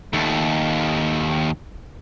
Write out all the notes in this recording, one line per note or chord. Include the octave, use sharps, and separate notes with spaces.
D#2 A3